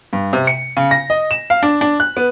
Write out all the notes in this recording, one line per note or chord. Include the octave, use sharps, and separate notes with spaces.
G2
C3
C#7
C#3
A#6
D#5
E7
F5
D4
D4
F#6
B3